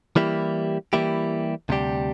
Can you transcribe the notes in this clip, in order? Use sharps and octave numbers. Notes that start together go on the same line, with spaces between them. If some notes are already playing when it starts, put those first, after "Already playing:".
E3 G3 A#3 E4 G4
E3 G3 A#3 E4 G4
D2 C3 G3 D4 G4